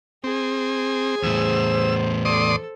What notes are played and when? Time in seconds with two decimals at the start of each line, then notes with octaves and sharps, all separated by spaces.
0.24 C4 G#4 G#5
1.23 E2 A2 C5 E6
2.25 A4 D5 C6 D#6